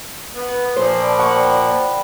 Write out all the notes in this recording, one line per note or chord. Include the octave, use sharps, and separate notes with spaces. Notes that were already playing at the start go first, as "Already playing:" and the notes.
B3
A#2 F3 C5
D5 A5 B5
F#5 B5 C#6
D5 G5 B5